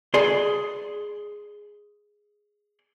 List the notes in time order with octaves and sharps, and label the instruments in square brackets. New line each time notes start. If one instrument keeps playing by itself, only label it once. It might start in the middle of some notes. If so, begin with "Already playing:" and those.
[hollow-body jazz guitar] G#4 D5 C6